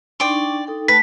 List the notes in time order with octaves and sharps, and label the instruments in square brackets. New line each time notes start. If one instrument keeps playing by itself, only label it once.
[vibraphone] D4 D#4 C#6 [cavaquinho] D5 G5 C6
[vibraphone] D#4 A4 G5
[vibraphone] A3 G5 A5 [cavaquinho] B4 [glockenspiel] B6